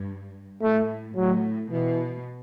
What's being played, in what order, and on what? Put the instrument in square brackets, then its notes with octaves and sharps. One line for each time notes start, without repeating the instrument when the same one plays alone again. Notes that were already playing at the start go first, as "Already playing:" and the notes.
Already playing: [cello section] G2
[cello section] A2 [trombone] A3
[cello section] A2 [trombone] F#3
[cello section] B2 [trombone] E3